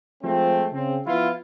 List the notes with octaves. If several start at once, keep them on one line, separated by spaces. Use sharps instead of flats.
F3 G#3 A3 C4
C#3 C4
F3 B3 E4 F4